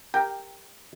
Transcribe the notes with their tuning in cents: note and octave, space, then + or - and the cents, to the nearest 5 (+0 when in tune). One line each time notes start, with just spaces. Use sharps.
G4 +15 A#4 +0 G5 +0